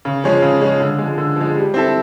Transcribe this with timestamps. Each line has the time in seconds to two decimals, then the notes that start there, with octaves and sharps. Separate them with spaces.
0.05 C#3
0.24 F3 G#3 C#4
0.42 C#3
0.61 F3 G#3 C#4
0.80 D3
0.98 F3 G#3
1.18 D3
1.36 F3 G#3
1.56 G3
1.74 C4 E4 A4